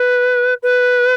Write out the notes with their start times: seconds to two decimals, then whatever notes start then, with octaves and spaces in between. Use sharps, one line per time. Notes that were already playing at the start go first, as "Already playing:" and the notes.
Already playing: B4
0.63 B4